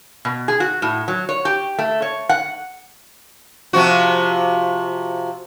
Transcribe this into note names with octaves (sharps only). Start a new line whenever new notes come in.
B2
G#4
F#4
A2
F#3
C#5
G4
A3
C#5
F#5
C3 F3 F#4